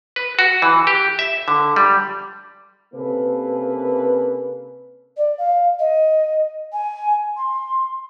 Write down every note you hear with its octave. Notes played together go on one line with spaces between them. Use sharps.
B4
F#4
E3
G4
E5
D3
G3
C3 A#3 C#4 A4 B4
D5
F5
D#5
G#5
C6